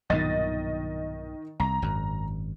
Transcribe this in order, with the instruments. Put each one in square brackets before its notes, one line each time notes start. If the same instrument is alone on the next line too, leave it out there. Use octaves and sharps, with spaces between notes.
[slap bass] B1 G2 A#2 [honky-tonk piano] D#3 D#5 A6
[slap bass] C2 [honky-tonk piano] A#5
[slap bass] G#1 F#2